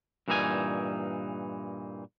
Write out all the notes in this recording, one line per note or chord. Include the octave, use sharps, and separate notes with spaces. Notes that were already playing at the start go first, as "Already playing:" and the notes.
G2 A#2 E3 D#4 A4 G#5